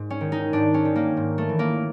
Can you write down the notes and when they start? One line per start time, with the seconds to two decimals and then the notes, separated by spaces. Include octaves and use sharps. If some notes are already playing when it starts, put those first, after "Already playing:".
Already playing: G#2
0.10 C#4
0.21 D#3
0.32 D#4
0.53 G#2 D4
0.74 C#4
0.85 D#3
0.96 A#3
1.17 G#2
1.38 A3
1.49 E3
1.59 A#3